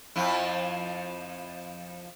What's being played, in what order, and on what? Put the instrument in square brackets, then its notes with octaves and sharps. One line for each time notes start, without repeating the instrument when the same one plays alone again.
[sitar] F2 F3 E4